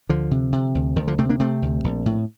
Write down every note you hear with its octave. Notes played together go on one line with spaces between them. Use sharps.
D2 D3 F3
C3
C3
D2
D2 D#3
D3 F3
C3 A3 C4
A#3 D4
C3 A3 C4
D2
A#1
A2